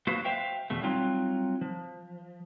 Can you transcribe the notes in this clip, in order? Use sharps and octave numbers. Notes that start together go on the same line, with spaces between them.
F#3 A#3 F#4 B4 C5 F5
C5 E5 F5 G5
E2 B2 A3
F#3 G3 C4 D#4 F4
F3